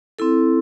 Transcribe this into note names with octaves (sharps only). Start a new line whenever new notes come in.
C4 E4 A4